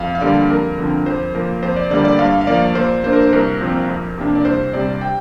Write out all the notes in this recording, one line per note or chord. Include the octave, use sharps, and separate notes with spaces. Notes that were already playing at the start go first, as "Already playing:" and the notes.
Already playing: F2 F5
F5
D3 G3 A#3 D5
F2 A#4
D3 F3 C4
F2 C5
F3 A#3 A#4
F2 C5
D5
D3 G3 A#3 D5
D5
G2 F5
F5
F3 A#3 D5
A#2 C5
A#3 D4 C5
A#4
C5
C2 A#4
A#2 F3 C4
F2
C3 A#3 D4
D5
C2 C5
C3 G3 C4 D5
G5